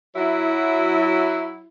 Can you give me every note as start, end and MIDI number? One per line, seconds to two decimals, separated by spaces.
0.16 1.65 54
0.16 1.65 64